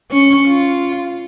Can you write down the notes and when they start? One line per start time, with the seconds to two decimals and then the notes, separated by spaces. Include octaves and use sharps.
0.11 C#4
0.47 F4